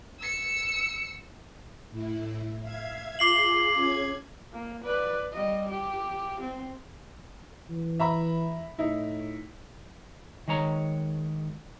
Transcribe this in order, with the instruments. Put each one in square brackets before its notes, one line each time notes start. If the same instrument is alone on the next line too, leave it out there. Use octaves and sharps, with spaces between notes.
[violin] E6 C#7
[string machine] A2 E4
E5 F5 G#6
[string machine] F4 G#4 [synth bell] D6 C7 F#7
[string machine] C#4 G#4 G#6
[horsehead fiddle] A#3
B4 D5
G3 D#5
G4
C4
[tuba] E3
[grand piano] E5 A#5 B5
[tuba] A2 [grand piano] D#4 E4
[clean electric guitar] D#3 G#3 C#5 A#5